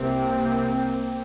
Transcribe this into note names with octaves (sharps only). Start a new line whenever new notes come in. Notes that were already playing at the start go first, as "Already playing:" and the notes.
Already playing: C2 C3 A#3 C4